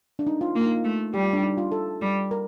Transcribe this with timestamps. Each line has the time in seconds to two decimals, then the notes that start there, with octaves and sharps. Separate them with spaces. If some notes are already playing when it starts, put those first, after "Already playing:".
0.19 D4
0.27 D#4
0.41 F4
0.55 A#3 F4
0.66 D#4
0.76 F4
0.84 A3
1.14 G3 G4
1.23 F4
1.33 D4
1.42 D#4
1.58 F4
1.72 A4
2.01 G3
2.31 A#4